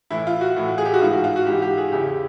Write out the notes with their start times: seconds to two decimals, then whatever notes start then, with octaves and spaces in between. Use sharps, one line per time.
0.10 A2 E3 E4
0.27 F4
0.41 F#4
0.56 A2 E3
0.78 G#4
0.85 G4
0.94 F#4
1.01 G#2 E3 F4
1.13 F#4
1.24 F4
1.36 F#4
1.47 G#2 E3 G4
1.62 G4
1.78 G#4
1.92 E2 C#3 E3 G4
2.07 G4